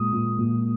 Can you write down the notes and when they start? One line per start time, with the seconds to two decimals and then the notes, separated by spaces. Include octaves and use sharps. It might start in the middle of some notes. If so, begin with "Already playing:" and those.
Already playing: A#2 G#3 D#6
0.13 A#2
0.39 A#2